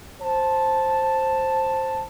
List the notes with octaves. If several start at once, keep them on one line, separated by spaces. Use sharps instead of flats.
C5 A5